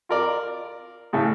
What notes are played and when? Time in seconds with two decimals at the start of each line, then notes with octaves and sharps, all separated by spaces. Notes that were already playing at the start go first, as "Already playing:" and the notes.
0.09 F4 A#4 D5
1.13 A2 C#3 A3